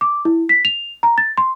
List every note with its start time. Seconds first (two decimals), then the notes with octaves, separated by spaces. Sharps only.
0.01 D6
0.25 E4
0.49 B6
0.65 F7
1.03 A#5
1.18 A6
1.38 C6